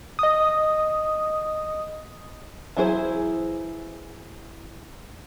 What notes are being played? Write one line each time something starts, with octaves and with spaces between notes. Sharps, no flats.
D#5 D#6
E3 F#3 E4 G#4 C5